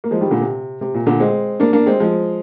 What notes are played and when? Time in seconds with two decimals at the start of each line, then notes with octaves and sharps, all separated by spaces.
0.04 A#3
0.11 F3 G#3
0.21 D#3 G3
0.31 A#2 D3
0.41 C3
0.81 C3
0.94 A#2
1.06 A#2 D3
1.20 G#3 C4
1.60 A#3 D4
1.73 A#3 D4
1.86 G#3 C4
2.00 F3 G#3